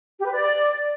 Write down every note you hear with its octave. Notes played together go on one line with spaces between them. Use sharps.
G4
B4
D5